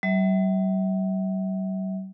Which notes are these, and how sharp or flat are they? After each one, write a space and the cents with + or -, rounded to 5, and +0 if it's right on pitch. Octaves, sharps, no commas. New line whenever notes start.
G3 -45 E5 -20